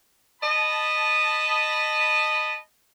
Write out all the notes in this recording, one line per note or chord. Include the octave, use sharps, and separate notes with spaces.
D#5 A5 B5